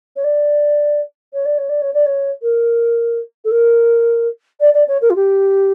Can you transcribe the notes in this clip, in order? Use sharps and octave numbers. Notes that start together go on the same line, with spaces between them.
C#5
D5
C#5
D5
C#5
D5
C#5
D5
C#5
A#4
A4
A#4
D5
D5
C#5
A#4
F4
G4